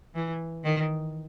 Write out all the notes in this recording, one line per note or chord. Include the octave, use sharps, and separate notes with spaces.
E3
D#3